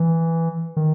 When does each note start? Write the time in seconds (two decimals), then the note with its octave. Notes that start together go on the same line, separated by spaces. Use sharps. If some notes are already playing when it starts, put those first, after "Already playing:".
Already playing: E3
0.77 D#3